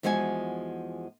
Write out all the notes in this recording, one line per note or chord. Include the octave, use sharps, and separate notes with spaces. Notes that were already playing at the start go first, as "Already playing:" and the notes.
E2 F3 G#3 F#4 D5 G#5